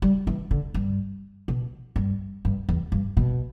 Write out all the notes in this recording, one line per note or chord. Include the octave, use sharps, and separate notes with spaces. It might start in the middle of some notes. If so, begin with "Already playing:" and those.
G3
E3
D3
G2
B2
G2
G2
E2
G2
B2